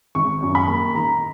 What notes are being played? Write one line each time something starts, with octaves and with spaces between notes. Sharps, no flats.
G#1 C#6
F#2
B5
A#3
D#3 A#5